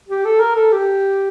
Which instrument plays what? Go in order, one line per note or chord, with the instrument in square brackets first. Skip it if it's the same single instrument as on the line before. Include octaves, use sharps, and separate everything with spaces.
[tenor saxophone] G4
A4
A#4
A4
G4